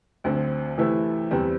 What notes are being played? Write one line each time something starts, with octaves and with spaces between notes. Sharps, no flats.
D2 D3 C4
C3 E3 A3 E4
E2 C3 G3 C4